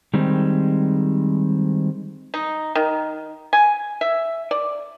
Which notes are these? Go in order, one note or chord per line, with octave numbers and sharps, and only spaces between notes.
D#3 G3 G#3 C4
D#4
D#3
G#5
E5
D5